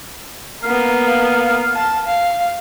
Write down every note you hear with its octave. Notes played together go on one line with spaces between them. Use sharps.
A#3 B3 F5
A5
F5